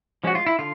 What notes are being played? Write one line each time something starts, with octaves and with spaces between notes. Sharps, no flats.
F3 G#3 C#4 F#4
F4
E4
D3 F4